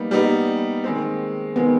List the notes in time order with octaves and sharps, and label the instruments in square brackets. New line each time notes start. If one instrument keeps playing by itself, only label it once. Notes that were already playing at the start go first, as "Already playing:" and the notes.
Already playing: [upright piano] G3 B3 D#4 [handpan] A#3
[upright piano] G3 B3 D#4
D#3 G#3 C4
[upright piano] D#3 G#3 C4 [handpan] B3